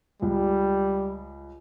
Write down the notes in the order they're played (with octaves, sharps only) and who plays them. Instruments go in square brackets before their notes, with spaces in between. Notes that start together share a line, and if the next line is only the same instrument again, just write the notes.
[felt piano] C#2 [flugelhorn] G3